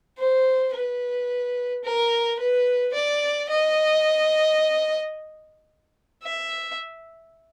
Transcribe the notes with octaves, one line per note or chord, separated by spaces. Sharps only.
C5
B4
A#4
B4
D5
D#5
E5